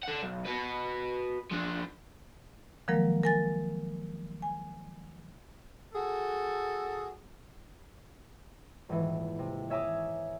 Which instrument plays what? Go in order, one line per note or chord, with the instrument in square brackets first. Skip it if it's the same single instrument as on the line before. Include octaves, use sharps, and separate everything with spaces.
[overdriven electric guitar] A4 F#5
B1
F#4 B4
F3 D4
[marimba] D#3 F3 F#3 G#3 A#3 A#4
A#4 G#5 A6
G#5
[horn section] F#4 G#4 A4
[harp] D#1 G#2 E3
C3
C#5 E5 G#5 A#5 D6 D#6